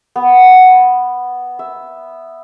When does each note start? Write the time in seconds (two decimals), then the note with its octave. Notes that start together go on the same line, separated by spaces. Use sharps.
0.16 B3
1.59 E5